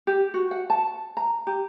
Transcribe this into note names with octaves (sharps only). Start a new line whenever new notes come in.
G4
F#4
F#5
A5
A#5
G4